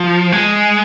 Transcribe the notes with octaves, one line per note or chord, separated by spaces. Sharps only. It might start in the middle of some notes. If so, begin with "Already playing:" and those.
Already playing: F3
G#3